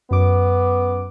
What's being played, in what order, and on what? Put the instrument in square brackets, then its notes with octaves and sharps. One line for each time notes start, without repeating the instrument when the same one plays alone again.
[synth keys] F#2 D6 [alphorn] B3